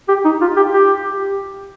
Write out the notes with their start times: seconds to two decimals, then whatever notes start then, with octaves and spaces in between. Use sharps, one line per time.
0.09 G4
0.25 D#4
0.41 F4
0.57 G4
0.73 G4